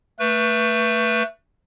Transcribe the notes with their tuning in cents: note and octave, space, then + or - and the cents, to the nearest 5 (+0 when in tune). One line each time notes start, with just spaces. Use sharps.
A3 +20 B4 -20